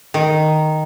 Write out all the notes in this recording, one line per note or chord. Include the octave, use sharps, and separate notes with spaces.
D#3